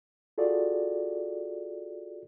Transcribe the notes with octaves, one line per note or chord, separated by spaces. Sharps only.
F4 F#4 G#4 A4 D5